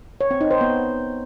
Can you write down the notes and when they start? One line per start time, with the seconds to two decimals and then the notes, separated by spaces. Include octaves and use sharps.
0.21 C#5
0.31 C4
0.41 D#4
0.51 C5
0.61 B3